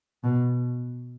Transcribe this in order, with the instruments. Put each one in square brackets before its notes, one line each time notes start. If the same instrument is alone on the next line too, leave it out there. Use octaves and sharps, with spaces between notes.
[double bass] B2